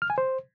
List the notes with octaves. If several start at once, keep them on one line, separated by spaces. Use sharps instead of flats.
F6
G#5
C5